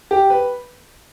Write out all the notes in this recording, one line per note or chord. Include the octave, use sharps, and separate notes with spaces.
G4
B4